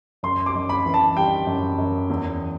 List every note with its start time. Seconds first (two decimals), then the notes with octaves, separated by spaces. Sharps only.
0.23 F#2 C6
0.46 D6
0.55 F#2
0.69 B5
0.86 E3
0.94 A5
1.16 G3 G5
1.47 F#2
1.78 F#2
2.10 E2